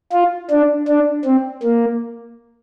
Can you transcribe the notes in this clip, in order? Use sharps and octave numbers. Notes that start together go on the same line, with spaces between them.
F4
D4
D4
C4
A#3